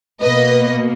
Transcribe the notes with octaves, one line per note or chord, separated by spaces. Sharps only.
B2 A#3 B4 D#5